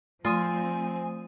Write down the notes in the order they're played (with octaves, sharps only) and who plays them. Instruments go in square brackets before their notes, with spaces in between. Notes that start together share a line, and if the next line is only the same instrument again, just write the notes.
[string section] F3 C4 [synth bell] A3 D#6 D#7 [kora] F4 [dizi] G#5